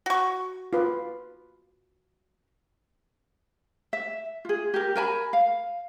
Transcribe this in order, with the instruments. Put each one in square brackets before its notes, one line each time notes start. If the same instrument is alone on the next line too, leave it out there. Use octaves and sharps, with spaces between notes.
[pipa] F#4 C#6
[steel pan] F4 B4
[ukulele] E5
F4 G#4
G4 A#4
A#4 G#5 A5 B5
F5